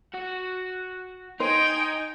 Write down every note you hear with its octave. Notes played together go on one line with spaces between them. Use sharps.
F#4 F#5
D#4 C5 G5 G#5